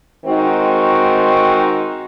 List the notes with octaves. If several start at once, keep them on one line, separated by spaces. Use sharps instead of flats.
D#3 G#3 C4 D#4 F#4